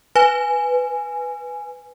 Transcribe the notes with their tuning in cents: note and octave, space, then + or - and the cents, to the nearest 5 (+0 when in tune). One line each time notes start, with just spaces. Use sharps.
B4 +0 G#5 +0